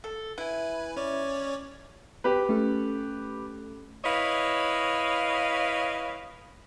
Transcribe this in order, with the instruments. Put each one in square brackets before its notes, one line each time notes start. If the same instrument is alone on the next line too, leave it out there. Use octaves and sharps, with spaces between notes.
[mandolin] A4
[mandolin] E4 [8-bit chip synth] B4 G#5
[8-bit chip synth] C#4 C#5 D5
[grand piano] G4 B4
[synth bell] A3 C#4 A4
[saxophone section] E4 B4 C#5 D#5 F5